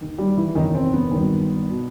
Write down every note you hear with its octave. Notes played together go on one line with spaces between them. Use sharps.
D#2 D#3
G3 G4
E3 E4
F#1 E2 B2 D#3 D#4
C4
B3
G#1 G2 D#3
B2